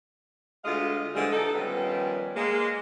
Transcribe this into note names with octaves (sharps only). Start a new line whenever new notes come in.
D2 G#3 F4 D#5 F5
D3 E3 F3 G3 G#3
D#4 A4
D#3 F3 G3 B3 C#4
G#3 A#3